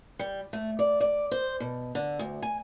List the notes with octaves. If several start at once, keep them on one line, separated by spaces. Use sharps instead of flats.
G3
A3
D5
D5
C5
B2
D3
D2
G#5